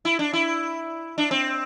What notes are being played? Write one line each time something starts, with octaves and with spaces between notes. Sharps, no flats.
E4
D4
E4
D4
C4